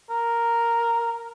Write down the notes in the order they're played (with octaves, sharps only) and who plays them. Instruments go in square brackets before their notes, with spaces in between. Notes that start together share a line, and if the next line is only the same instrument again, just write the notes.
[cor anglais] A#4